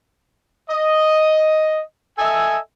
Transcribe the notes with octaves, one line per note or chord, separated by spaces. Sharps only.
D#5
A4 D#5 E5 G#5